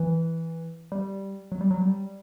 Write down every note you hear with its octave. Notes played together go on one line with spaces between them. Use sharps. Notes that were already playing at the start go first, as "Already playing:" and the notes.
Already playing: E3
G3
F#3
G3
F#3
G3